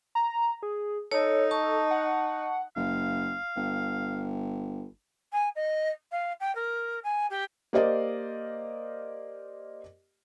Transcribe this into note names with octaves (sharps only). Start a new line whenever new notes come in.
A#5
G#4
D#4 A4 C#5
A5 C#6
F#5
F#1 F5
G1
G#5
D#5
F5
G5
A#4
G#5
G4
A#3 G4 A#4 C5 D5 D#5